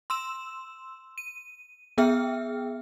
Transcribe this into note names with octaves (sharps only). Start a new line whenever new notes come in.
C6 E6 E7
D#7
B3 G#4 E5 G5 F6